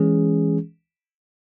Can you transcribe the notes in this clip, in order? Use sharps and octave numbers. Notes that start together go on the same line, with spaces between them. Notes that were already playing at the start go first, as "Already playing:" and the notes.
Already playing: E3 G#3 C#4 G#4